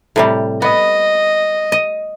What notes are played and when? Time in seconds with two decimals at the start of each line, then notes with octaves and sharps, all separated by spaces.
0.16 A2 C3 G3
0.62 B3 D#5
1.72 D#5